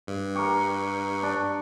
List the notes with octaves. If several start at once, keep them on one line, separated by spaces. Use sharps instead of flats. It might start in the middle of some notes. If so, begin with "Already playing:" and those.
G2
G4 A#4 C#6
D4